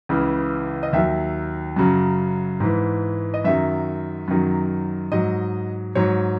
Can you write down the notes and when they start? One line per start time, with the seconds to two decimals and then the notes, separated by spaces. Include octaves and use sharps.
0.09 C#2 C#3 E3
0.83 D#5
0.93 D#2 D#3 F#3 E5
1.76 F#2 C#3 F#3
2.60 G#2 E3
3.34 D#5
3.44 F#2 D#3 F#3 E5
4.28 F#2 D#3 F#3
5.12 G#2 F#3 D#5
5.95 G#2 F#3 C#5